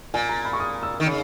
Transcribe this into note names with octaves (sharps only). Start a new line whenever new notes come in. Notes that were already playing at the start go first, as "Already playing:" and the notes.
A#2 G#5
A#5
B5
C#6
D#6
E6
D#3
C#3